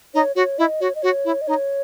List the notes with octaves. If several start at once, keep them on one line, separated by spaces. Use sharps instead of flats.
D#4 C#5
F#4 C#5
E4 D#5
F#4 C#5
D#5
F#4 C#5
E4
D#5
D#4 C#5